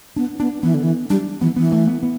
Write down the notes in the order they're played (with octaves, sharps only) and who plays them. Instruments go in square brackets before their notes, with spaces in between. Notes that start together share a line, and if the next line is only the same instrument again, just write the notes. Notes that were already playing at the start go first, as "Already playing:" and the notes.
[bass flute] B3 [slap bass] D4
[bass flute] B3 [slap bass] D4
[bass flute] E3 [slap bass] B3
[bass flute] D3
E3
[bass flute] G3 [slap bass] D4
[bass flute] E3 [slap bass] B3
[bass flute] E3 [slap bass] B3
[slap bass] A3
B3
B3